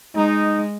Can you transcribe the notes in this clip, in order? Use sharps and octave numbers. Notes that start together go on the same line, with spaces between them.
G#3 D#4